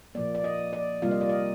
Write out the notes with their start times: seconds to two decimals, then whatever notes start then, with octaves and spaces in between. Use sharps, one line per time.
0.15 A#2 F3 A#3 D5
0.35 D5
0.44 D#5
0.73 D5
1.02 C3 G3 A#3 F4 F5
1.11 D#5
1.21 D5
1.29 D#5